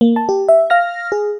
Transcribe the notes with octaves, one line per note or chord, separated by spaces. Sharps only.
A#3
A5
G4
E5
F5 F6 A#6
G#4